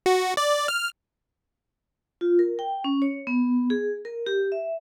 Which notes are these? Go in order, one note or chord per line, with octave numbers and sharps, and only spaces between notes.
F#4
D5
F6
F4
A#4
G5
C#4
C#5
B3
G#4
A#4
G4
E5